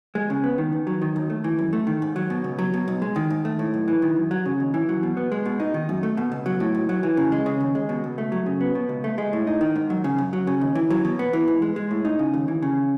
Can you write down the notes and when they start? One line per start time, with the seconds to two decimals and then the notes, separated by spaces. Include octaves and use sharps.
0.15 G#3
0.30 C#3
0.44 B3
0.58 D#3
0.72 E2
0.87 F#3
1.02 D#3
1.16 D#2
1.30 A3
1.44 E3
1.59 F#2
1.73 A3
1.87 D#3
2.02 G#2
2.16 F#3
2.30 B2
2.44 C#2
2.59 F#3
2.74 B2
2.88 B1
3.02 G#3
3.16 D#3
3.30 G#2
3.45 A3
3.59 A2
3.74 B1
3.88 E3
4.02 D#3
4.16 F#2
4.31 F#3
4.46 C#3
4.60 D#2
4.74 E3
4.89 F#3
5.03 B2
5.17 B3
5.32 G#3
5.45 B2
5.60 D#4
5.74 D#3
5.89 F#2
6.03 A3
6.17 B2
6.32 C#2
6.46 F#3
6.60 A2
6.75 B1
6.89 F#3
7.03 E3
7.17 C#3
7.32 G#3
7.46 C#3
7.61 D#2
7.75 G#3
7.89 B2
8.04 C#2
8.18 A3
8.32 F#3
8.46 C#3
8.61 B3
8.75 B2
8.89 C#2
9.04 A3
9.18 G#3
9.33 A2
9.47 D#4
9.61 D#3
9.76 G#2
9.90 F#3
10.04 C#3
10.18 F#2
10.33 F#3
10.47 C#3
10.61 D#2
10.75 E3
10.90 F#3
11.05 B2
11.19 B3
11.33 E3
11.48 G#2
11.62 G#3
11.76 G#3
11.91 A2
12.05 D#4
12.19 C#3
12.34 D#2
12.48 E3
12.62 C#3